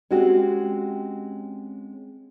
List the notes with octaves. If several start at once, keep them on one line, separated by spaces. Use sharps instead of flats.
G#3 C4 C#4 F#4 G4